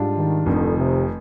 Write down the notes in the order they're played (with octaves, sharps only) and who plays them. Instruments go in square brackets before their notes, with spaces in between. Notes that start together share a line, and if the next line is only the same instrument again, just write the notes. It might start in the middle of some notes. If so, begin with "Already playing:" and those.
Already playing: [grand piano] G#2 G3 D4 F4
[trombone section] D#3
[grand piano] F1 F2 D#3 [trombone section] D3
[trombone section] C3